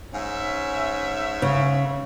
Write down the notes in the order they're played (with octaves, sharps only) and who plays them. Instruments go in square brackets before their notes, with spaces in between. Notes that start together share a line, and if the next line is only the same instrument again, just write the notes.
[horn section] G#2 C#4 E5
[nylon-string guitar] C#3